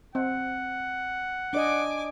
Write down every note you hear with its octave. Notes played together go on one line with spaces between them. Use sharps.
C4 F#5
D4 D5 D#5 G#5 D6